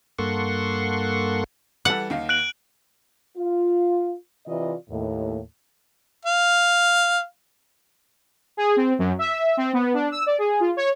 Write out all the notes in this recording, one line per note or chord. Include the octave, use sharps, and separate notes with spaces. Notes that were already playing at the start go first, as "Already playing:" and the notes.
G2 A#3 A4 F#5 C6 C#6
E3 G3 A4 F#5
D#2 D#3 F5
F#6 D7 F#7
F4
C3 E3 F4 D5 D#5
D#2 A2
F5
G#4
C4
F#2
E5
C4
B3
D4
E6
D5
G#4
F4
C#5